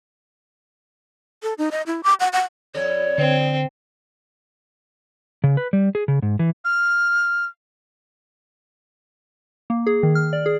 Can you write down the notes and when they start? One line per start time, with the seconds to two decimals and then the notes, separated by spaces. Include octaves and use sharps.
1.43 A4
1.58 D#4
1.71 D#5
1.87 E4
2.03 D6
2.20 F#5
2.33 F#5
2.75 F2 A4 C#5 D5
3.18 D3 C4
5.44 C#3
5.57 B4
5.73 G3
5.95 G#4
6.08 C#3
6.22 G#2
6.39 E3
6.65 F6
9.70 A#3
9.87 G#4
10.03 D#3
10.15 F6
10.33 D5
10.46 G#4